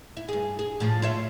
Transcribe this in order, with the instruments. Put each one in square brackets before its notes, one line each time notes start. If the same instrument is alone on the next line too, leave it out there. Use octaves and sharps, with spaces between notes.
[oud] E4
G2 G#4
G#4
A2 F3
F4 C#5 E5